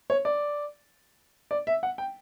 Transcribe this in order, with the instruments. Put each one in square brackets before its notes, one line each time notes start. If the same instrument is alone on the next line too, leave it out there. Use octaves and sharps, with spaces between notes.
[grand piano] C#5
D5
D5
E5
F#5
G5